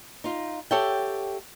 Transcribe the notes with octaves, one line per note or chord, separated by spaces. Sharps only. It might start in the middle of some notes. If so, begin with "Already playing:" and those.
D#4 F4
G4 A4 C#5 E5 F#5 G5